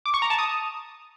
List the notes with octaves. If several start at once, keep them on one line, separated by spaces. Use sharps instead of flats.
D6
C#6
A#5
A5
D#6